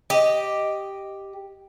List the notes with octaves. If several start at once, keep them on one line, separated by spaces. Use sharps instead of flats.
G4 D#5